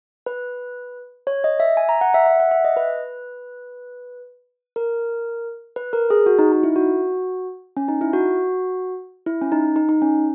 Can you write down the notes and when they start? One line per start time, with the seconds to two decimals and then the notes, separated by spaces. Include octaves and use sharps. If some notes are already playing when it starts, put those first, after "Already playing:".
0.26 B4
1.27 C#5
1.44 D#5
1.60 E5
1.77 G#5
1.89 A#5
2.01 F#5
2.14 E5
2.26 E5
2.40 F#5
2.51 E5
2.65 D#5
2.77 B4
4.76 A#4
5.76 B4
5.93 A#4
6.10 G#4
6.26 F#4
6.39 D#4
6.52 D#4
6.63 E4
6.76 F#4
7.77 C#4
7.88 D#4
8.01 E4
8.13 F#4
9.26 E4
9.42 C#4
9.52 D#4
9.76 D#4
9.89 D#4
10.02 C#4